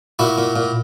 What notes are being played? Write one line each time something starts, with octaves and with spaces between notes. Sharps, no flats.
A#2 E4 F#4
A#2
A#2